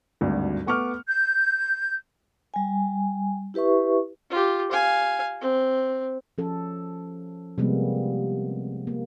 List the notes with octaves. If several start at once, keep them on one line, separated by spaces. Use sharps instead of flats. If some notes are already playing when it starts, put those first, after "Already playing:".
G#1 D2 G2
A3 B3 C#6 D6 F6
G6
G3 G#5
E4 G4 B4 E5 C#6
F4 G4
F5 G#5
C4
F3 C#4 A4
C3 F3 G3 G#3 A#3 B3
A#3